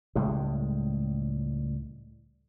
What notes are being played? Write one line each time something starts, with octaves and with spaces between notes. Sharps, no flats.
C#2 A2 G3 G#3